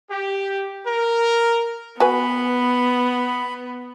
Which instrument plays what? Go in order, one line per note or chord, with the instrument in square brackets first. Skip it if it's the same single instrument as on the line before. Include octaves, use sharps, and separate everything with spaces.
[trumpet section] G4
A#4
[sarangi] B3 [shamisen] F#4 B4 G#5 [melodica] B5